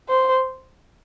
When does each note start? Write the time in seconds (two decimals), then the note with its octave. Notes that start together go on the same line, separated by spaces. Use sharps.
0.09 C5